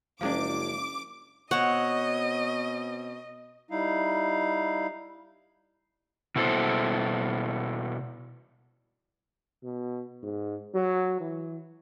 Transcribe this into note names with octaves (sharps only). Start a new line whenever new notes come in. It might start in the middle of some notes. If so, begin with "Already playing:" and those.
F#1 F3 G#3 C#4 D4 E4 F5 D6
B2 C4 C#5 D#5 F#5
G3 D#4 E4 F5
B2 E4 A4 C5
B2
G#2
F#3
E3